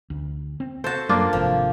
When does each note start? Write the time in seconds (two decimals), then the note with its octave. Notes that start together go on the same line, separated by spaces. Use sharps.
0.10 D2
0.60 C4
0.84 F#4 A4 C5 A5
1.09 F#2 F#3 G3 A#3 D4 F4
1.33 G#1 C3 F3